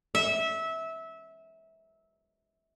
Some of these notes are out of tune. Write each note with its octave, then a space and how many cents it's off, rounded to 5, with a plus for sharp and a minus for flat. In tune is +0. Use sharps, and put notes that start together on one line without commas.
E5 -20